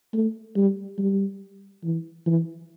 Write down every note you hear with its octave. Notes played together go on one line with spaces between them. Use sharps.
A3
G3
G3
E3
E3